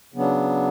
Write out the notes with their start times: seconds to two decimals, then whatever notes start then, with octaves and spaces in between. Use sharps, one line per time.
0.14 C#3 F#3 B3 D4